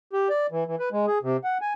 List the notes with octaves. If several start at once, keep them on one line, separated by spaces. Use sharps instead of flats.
G4
D5
E3
E3
B4
G#3
G#4
C3
F#5
G#5